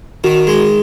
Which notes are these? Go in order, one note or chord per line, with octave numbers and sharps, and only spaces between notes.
D#3 F#4
G#3